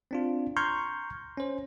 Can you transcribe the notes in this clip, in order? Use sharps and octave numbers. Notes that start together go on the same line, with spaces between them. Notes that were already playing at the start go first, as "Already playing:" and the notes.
C4 D4 F4
A#5 C6 C#6 F6 G6 G#6
C#4 C5